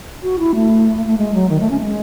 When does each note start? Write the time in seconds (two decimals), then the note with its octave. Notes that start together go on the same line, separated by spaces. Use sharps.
0.23 F#4
0.39 E4
0.55 A3
1.06 A3
1.18 G#3
1.34 F#3
1.49 D#3
1.60 A3
1.71 C#4
1.81 G#3